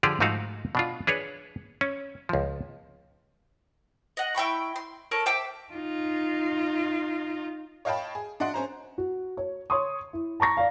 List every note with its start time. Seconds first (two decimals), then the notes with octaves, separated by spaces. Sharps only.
0.03 D3 F3 G4 G#4 D5
0.20 G#2 F3 A3 D#4 F#4 F5
0.75 B2 D4 F4
1.07 D4 G#4 B4 C#5
1.81 C#4
2.29 C#2 F3
4.17 D#5 F#5
4.35 E4 G5 B5 C#6
4.76 C6
5.11 A4 A#4 C#5
5.26 C5 E5 G5 D6
5.73 D#4 F4
7.85 C#5 D#5 F5 G5 A5 B5
8.15 G#4
8.40 D4 D#5 F#5 C6
8.54 C#4 C5 A#5
8.98 F#4
9.37 C#5
9.70 C#5 C6 C#6 D#6
10.13 E4
10.40 A5 A#5 C#6 A#6
10.57 D5 F5